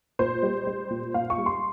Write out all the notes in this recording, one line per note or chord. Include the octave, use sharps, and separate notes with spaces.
A#2 C5
G3
G3
A#2
A#2 F5
C#6
G3
C6